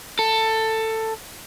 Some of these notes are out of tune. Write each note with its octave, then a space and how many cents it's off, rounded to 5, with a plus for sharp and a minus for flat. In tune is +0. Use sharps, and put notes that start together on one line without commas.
A4 +15